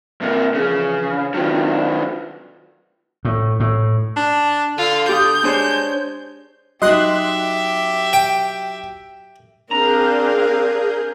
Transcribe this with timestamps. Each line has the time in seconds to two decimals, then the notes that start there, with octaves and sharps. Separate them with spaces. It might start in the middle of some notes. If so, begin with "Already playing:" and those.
0.22 C3 A#3
0.54 C#3 E3 F3 G#4
1.34 D#3 F#3 C4 D4 F4
3.25 A2
3.60 A2
4.16 D4
4.78 D3 F4
5.09 G4 D#6 G6
5.43 G#3 D4 C5 C#5
6.82 F#3 D#4 G4 D#5 E5 C6 F#6
8.13 G5
9.71 C4 D4 G#4 A#4 F5 A#5 G6